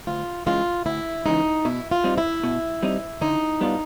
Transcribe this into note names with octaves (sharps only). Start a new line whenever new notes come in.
D2 F4
C#3 E3 G#3 F4
D2 E4
C#3 E3 G#3 D#4
B2 E4
F4
G3 C4 D#4
E4
B2
G3 C4 D#4
D3 D#4
G3 B3 D4 F4